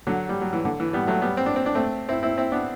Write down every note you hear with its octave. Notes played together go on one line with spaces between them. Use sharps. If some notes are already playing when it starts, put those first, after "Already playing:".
D3 F#3
G3
F#3
E3
D3
E3
G3 B3
F#3 A3
G3 B3
C4
D4
C4
D4
A3 C4
C4 E4
C4 E4
C4 E4
B3 D4